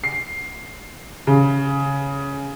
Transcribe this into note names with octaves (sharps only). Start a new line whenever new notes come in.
C7
C#3